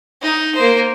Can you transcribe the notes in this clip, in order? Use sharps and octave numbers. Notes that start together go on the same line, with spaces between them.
D#4
A#3 C5